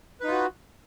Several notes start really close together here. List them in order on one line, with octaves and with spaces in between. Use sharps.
B4 D#4 F4 F#4